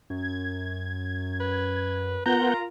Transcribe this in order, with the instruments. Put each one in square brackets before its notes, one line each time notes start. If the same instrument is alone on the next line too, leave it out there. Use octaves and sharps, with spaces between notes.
[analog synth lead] F#2 [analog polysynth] G#6
[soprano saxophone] B4
[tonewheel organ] B3 F#5 G6 [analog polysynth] F4 A#4 [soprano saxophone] A#5